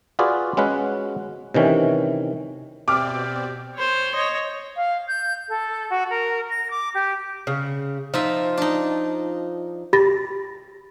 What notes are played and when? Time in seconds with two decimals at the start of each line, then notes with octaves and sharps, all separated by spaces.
0.19 F4 F#4 G#4 B4 D5
0.57 G#3 C#4 F#4 B4 F#5
1.54 C3 D#3 E3 C#4
2.88 B2 C4 G4 D5 E5 D6 F6
3.75 C5 C#5
4.14 C#5 D#5
4.77 F5
5.08 G6
5.49 A4
5.90 F#4
6.10 A#4
6.50 A#6
6.71 D6
6.95 G4
7.47 C#3
8.14 F3 D#4 F4 E5
8.58 D4 D#4
9.93 G4 B5 A6 A#6